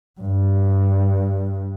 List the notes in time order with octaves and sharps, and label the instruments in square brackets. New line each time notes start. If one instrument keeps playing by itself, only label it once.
[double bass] G2